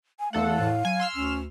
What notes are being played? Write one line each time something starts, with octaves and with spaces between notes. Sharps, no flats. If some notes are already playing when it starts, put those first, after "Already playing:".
G#5
E2 A3 A4 F5 F#5
A2
F#3 G#5
C6 E6 F6
D2 C#4